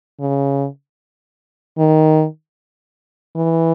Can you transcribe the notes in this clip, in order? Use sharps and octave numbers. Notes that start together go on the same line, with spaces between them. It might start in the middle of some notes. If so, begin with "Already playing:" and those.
C#3
D#3
E3